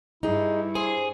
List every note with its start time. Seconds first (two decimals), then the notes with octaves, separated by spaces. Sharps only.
0.23 G2 D#4 E4 G#4
0.75 G#4 C5